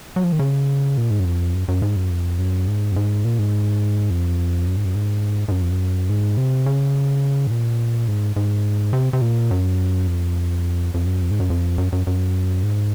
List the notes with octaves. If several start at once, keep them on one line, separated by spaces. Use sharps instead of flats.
F#3
F3
D#3
C#3
A#2
G#2
F#2
F2
F#2
F#2
G#2
F#2
F2
F#2
G#2
F#2
G#2
A#2
G#2
F2
F#2
G#2
F#2
G#2
G#2
F#2
F2
F#2
G#2
C3
C#3
G#2
A#2
G#2
G#2
C3
C3
A#2
F#2
F2
F2
F#2
F2
G#2
F#2
F2
F#2
F#2
F#2
G#2